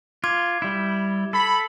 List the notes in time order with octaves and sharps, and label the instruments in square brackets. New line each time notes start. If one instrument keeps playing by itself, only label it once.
[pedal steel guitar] F4 [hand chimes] D6 G#6
[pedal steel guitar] G3 E4
[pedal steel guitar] A4 [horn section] B5